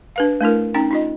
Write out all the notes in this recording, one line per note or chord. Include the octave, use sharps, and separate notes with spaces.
D4 B4 F5
A3 D4 E4 A#4
C#4 D#4 G5 A#5
D#4 F4 D#5